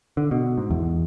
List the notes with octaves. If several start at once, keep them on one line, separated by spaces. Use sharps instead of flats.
D3
B2
G#2
E2